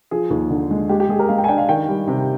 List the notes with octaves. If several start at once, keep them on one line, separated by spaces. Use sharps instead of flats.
F3 G#4
D#2
D3
G#3
G#3 G4
G4
G#3 G#4
A#4
G#3 F5
G5
G#5
D4 G5
F5
D#3 G5
G3
C3